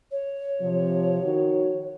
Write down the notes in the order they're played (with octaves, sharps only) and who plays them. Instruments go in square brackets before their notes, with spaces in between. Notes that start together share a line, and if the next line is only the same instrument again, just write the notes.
[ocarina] C#5
[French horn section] C3 F3
D#3 F#4